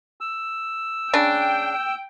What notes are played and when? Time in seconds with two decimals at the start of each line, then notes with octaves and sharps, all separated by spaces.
0.21 E6
1.14 C#3 D4 G5